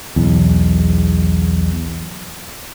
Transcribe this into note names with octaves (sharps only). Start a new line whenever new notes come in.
B1 E2